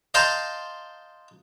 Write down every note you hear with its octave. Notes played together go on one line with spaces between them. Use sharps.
D#5 F5 G5 A5 A#5 C6